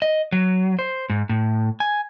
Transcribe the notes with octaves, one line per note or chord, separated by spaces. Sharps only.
D#5
F#3
C5
G#2
A2
G#5